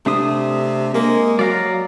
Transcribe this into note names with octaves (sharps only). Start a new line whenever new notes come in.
C3 A3 D4 D#6
G#3 A#3
F#3 D5 F5 A#5